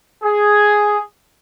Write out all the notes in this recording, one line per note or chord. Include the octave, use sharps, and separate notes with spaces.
G#4